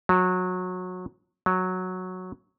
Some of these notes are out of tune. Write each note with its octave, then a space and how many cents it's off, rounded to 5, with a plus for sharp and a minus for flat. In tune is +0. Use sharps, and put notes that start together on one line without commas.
F#3 -20
F#3 -5